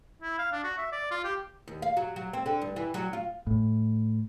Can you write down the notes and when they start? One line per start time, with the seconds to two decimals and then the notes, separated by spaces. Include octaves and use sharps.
0.22 E4
0.38 F5
0.52 D4
0.63 F#4
0.78 E5
0.92 D5
1.11 F4
1.24 G4
1.68 D#2
1.82 F5
1.97 F#3
2.16 F#3
2.33 C4
2.46 D3
2.61 G2
2.76 E3
2.94 F#3
3.13 F4
3.47 A2